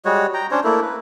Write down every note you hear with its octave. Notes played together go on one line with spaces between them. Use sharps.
G3 G#3 F#4 C#5
G5 A#5
C#4 D4 C5 C#5
A3 A#3 E4
B4